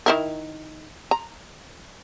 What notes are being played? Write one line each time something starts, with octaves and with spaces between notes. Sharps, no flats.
D#3 E4 A#4
A#5